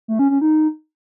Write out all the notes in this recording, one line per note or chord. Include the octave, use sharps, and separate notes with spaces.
A3
C#4
C#4
D#4